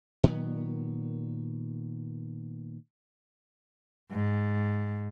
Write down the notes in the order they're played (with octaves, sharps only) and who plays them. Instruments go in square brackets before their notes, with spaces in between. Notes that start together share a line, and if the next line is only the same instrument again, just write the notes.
[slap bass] A#2 D#3 F#3 B3
[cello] G#2